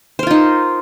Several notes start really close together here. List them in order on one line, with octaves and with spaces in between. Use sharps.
C5 A#4 F4 D#4